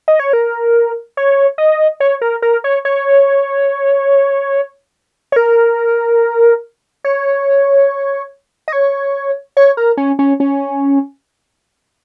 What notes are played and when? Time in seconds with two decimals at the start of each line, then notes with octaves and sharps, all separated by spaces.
0.08 D#5
0.19 C#5
0.33 A#4
1.17 C#5
1.58 D#5
2.00 C#5
2.22 A#4
2.42 A#4
2.64 C#5
2.85 C#5
5.32 C#5
5.36 A#4
7.04 C#5
8.68 D#5
8.72 C#5
9.57 C#5
9.77 A#4
9.97 C#4
10.19 C#4
10.40 C#4